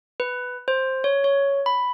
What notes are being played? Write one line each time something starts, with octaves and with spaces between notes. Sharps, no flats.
B4
C5
C#5
C#5
B5